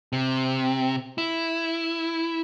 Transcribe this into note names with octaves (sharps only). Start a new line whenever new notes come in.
C3
E4